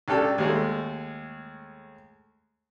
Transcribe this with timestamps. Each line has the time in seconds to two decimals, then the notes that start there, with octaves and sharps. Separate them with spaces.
0.08 C#2 D4 G4 A4
0.38 D#2 G#3 A3